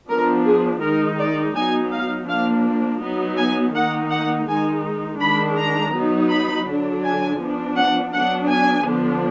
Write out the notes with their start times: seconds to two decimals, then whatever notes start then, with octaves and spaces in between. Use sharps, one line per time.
0.09 F3 B3 D4 A#4
0.45 G#4
0.82 D#3 G#3 D#4 A#4
1.19 D5
1.55 F#3 B3 D#4 G#5
1.92 F5
2.28 F3 A#3 D4 F5
3.01 F#3 B3 D#4
3.37 G#5
3.74 D#3 A#3 D#4 F#5
4.11 F#5
4.48 D#3 G#3 D#4 G#5
5.20 D#3 G#3 D4 B5
5.57 A#5
5.94 F#3 B3 D#4
6.31 B5
6.67 D3 F#3 D4
7.03 G#5
7.40 F3 B3 D4
7.77 F#5
8.13 F#3 B3 D4 F#5
8.49 G#5
8.86 D3 F3 B3 D4